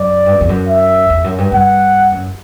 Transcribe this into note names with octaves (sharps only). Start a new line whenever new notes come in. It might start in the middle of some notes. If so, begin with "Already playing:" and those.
Already playing: F#2 D5
G2
F#2
E2
F#2
E5
E2
F#2
G2
G2 F#5
F#2